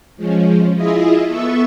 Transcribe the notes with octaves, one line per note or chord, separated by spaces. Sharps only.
F3 G#3 C#4
E4 F4 G#4 D#5 E5
B3 A4 E5 C#6 E6